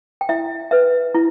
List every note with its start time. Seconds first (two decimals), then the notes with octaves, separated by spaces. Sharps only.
0.21 G5
0.29 E4 E5
0.71 B4 E5
1.14 E4